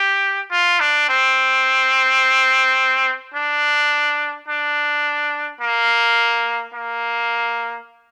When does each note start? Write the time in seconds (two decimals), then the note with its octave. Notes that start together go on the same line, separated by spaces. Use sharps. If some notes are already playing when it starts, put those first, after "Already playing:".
Already playing: G4
0.51 F4
0.80 D4
1.09 C4
3.34 D4
4.49 D4
5.61 A#3
6.74 A#3